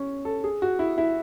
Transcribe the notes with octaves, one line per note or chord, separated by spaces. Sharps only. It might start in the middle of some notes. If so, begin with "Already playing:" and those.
Already playing: C#4
A4
G#4
F#4
E4
E4